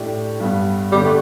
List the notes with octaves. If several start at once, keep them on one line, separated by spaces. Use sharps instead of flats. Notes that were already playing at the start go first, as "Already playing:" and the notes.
Already playing: A2 A3 D4 G4
G2 G3 B3
D3 G3 B3 G4
A3